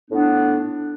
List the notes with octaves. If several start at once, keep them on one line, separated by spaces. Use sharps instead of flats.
A2 B3 D4